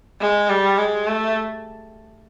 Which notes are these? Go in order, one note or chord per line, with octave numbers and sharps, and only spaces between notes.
G#3
G3
G#3
A3